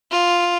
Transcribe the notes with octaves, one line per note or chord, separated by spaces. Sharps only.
F4